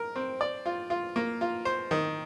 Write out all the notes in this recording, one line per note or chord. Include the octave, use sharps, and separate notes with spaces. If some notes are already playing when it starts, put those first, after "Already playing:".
Already playing: A#4
C4
D5
F4
F4
A#3
F4
C5
D#3